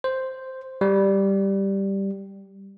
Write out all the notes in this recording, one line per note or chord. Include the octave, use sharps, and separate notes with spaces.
C5
G3